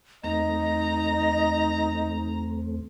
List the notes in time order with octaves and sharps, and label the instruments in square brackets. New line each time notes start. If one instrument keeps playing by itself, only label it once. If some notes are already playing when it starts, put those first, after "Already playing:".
[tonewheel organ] E2 A3 C4 [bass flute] D#4 [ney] D#5 [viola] A#5